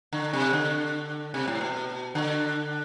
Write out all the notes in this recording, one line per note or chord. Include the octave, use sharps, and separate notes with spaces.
D3
C3
D3
C3
A2
B2
D3